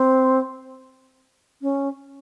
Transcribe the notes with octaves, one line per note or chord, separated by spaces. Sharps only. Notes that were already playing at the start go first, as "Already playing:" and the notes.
Already playing: C4
C#4